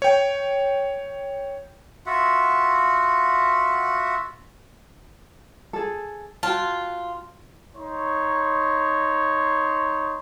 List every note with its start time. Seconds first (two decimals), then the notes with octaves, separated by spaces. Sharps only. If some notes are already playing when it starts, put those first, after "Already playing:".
0.02 C#5 G5
2.06 F4 F#4 E5 F#5
5.73 G#4 A4
6.43 F4 F#4 G5 A5
7.74 D#4 C#5 C6